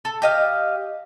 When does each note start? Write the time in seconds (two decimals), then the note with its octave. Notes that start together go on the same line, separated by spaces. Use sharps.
0.05 A4
0.22 G4 D#5 F5